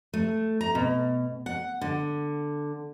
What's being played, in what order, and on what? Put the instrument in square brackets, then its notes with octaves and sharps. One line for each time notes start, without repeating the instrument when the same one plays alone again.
[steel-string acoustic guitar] A3
A#5
B2
F#5
D3